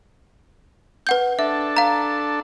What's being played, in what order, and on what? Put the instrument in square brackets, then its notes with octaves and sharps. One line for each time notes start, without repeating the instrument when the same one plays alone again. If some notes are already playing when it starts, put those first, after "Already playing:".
[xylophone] B4 F#5 G6
[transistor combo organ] D4 A4 [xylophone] E5
[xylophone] F5 A#5